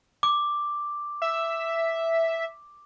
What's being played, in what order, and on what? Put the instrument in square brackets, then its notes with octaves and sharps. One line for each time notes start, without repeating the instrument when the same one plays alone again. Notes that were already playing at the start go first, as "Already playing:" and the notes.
[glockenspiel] D6
[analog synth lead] E5